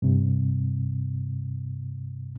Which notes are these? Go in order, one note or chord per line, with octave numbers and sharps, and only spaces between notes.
G2 C3